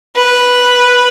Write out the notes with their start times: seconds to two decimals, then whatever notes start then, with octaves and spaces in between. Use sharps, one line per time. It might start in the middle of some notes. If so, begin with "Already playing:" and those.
0.16 B4